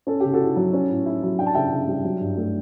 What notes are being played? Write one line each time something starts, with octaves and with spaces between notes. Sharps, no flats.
C#4 A4
C#3 G4
F#4 A4
E4
F#3
C#4
A2
E4
F#3
D4 G5
A5
C#3 E5 G5
C#3
G3
F#3
G2
A3